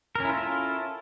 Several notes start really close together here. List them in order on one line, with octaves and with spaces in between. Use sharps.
A#4 C#4 E4 F4 A4